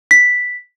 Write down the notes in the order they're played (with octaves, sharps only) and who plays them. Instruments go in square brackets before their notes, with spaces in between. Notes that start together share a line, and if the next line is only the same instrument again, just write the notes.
[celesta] B6